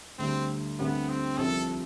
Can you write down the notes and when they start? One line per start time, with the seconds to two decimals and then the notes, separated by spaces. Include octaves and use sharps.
0.18 D2 D3 G3 C4
0.78 D2 D3 G3 B3 C4 G4
1.09 C4
1.38 C2 C3 F3 C4 A4